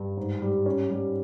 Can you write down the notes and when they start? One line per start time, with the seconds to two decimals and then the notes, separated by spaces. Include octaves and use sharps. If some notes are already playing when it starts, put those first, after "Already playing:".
Already playing: G2
0.17 G#2
0.42 G3
0.66 C#4
0.90 G3